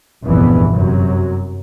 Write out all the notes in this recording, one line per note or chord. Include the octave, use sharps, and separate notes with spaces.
F1 A#1 E2 G2 E3 B3
F#2 C3 F#3